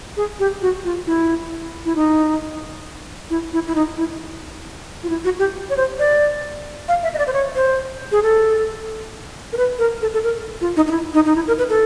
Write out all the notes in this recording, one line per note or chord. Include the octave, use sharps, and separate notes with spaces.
G#4
G4
F#4
F4
E4
E4
D#4
E4
E4
E4
D#4
E4
F4
E4
F#4
G4
C#5
C5
D5
F5
E5
D#5
D5
C5
C#5
C5
G#4
A4
A#4
B4
A#4
A4
A4
A#4
F4
D#4
D#4
E4
D#4
D#4
E4
A#4
B4
A4